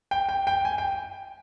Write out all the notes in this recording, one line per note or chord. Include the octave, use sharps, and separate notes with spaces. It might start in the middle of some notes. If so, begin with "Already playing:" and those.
G5
G5
G5
G#5
G5